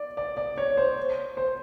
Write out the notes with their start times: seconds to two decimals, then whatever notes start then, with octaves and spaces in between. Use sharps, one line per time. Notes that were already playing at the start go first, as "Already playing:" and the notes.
Already playing: D5
0.17 D5
0.37 D5
0.58 C#5
0.77 C5
1.37 C5